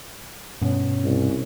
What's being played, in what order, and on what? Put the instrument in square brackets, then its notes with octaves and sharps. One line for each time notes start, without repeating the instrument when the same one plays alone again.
[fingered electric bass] G2 B2 [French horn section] C#4
[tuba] C2